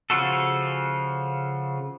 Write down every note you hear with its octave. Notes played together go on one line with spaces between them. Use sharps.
C#3 F3 F4 F#4 A4